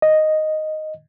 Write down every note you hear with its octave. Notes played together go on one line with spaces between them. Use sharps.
D#5